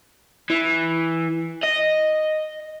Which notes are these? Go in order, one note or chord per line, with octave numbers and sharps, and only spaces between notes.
E3
D#5